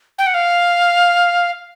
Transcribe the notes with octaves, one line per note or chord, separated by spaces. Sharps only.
G5
F#5
F5